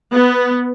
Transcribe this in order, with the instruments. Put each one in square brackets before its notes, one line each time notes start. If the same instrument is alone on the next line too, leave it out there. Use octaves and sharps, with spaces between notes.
[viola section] B3